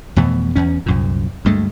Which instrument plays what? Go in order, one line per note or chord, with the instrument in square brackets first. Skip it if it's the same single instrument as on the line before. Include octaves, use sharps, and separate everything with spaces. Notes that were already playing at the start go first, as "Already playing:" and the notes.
[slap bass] F2 B2 E3 A3
E2 C#4
C2 F#2 A#2
D2 G2 G#3 A3